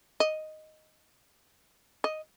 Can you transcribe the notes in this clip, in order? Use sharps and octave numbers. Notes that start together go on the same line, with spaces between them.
D#5
D#5